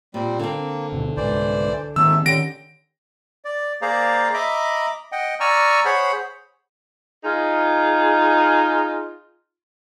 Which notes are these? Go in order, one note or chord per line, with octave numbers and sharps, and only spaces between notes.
A#2 G3 C4
D3 A#3 C4
D2 B2 E3
C2 G#2 E3 C5 D5
D#2 G#2 D#3 A3 C4 E6
D3 D#3 C#4 G4 A#6 D7
D5
A#3 G#4 C5 D5 F5 A#5
D#5 E5 A#5 B5 D6
D#5 F#5 G5
D5 G#5 A#5 C#6 E6 F6
G#4 C5 C#5 F#5 B5
D#4 F4 G#4